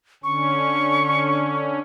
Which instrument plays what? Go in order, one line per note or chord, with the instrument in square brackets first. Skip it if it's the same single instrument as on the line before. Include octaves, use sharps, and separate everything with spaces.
[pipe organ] D3 C#4 [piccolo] C#6